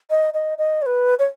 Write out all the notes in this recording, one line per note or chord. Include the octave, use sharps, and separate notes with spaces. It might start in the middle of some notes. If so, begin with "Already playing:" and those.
D#5
D#5
D#5
C#5
B4
C#5